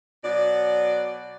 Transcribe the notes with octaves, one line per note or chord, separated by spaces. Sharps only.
B2 F#3 D5